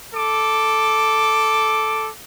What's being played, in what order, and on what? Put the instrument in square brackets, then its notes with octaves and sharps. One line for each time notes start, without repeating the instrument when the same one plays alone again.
[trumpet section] A4 D6